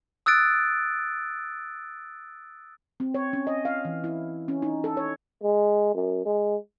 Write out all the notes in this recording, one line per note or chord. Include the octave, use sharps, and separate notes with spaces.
D#6 E6 F#6 A6 D7
C4
C#5
C#4
D#5
F5
E3
E4
C#4
D#4
A4
C#5
G#3
F#2
G#3